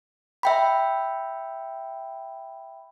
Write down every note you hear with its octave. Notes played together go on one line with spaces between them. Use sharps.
E5 G5 B5